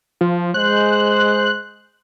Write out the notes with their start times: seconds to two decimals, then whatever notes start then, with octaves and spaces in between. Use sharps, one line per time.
0.21 F3
0.54 G#3 C5 F#6